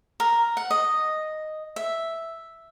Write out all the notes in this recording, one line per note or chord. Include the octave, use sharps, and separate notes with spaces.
A#4
F#5
D#5
E5